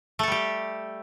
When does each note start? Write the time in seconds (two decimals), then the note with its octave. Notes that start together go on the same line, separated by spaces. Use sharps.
0.19 A3
0.23 A4
0.27 G3
0.32 G4